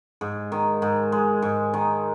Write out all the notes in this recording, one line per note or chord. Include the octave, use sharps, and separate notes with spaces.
G#2
D#3
G#2
G#3
G#2
D#3